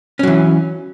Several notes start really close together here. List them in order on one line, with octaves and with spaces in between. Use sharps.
C#4 F#3 E3